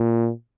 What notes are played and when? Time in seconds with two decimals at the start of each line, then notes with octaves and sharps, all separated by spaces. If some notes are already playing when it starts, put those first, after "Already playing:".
Already playing: A#2